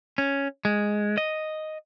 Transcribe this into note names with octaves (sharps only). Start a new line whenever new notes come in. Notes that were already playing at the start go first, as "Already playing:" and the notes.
C#4
G#3
D#5